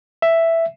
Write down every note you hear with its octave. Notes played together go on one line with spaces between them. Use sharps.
E5